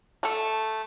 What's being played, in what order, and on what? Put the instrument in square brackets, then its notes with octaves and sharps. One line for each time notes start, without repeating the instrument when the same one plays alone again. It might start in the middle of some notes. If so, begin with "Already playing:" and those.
[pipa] A3 A4